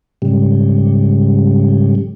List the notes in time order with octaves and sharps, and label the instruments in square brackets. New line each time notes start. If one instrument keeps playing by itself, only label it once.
[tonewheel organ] G#2 C#3 G3